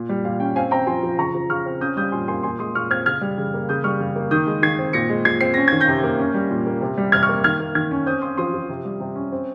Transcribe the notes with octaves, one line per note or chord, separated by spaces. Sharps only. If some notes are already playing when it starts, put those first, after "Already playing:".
Already playing: A#2
G3
A#2 F5
C#4 G5
C4 F5 G#5
C4 G5 A#5
F3 G#5 C6
F3
C#3 A#5 C#6
F3
C#3 C#6 F6
C4
C#4 D#6 G6
G3 D#6 G6
A#2 G#5 C6
A#3 G#5 C6
A#2 G#5 C6
G#3 C6 D#6
A#2 C#6 F6
C4 F6 G#6
C#3 F6 G#6
G3
C#3
A#3
C#3 D#6 G6
G3 C#6 F6
C#3
A#3
D#3 D#6 G6
G#3
D#3 G#6 C7
C4
A#2 A#6 C#7
G#3
A#2 G#6 C7
C4 C7
C#4 A#6
D#3 G#6
G6 A#6
C3
A#3
C#4
G3
A#2
A#3
C3
G3
C3 F6 G#6
C#6 F6
A#3
D#3 F6 G#6
A#3
D#3 F6 G#6
C#4
C4 D#6 G6
C4 C6 D#6
F3 C6 D#6
F3
C3
G3
C3
C#4
C4